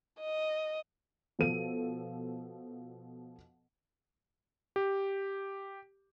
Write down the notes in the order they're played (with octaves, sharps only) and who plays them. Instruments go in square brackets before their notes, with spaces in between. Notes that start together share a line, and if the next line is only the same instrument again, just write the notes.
[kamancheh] D#5
[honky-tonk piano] B2 F3 A4 D#7
[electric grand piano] G4